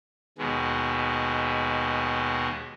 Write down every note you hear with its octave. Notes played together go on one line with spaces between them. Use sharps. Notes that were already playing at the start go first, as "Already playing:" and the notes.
D#2 B2 G#3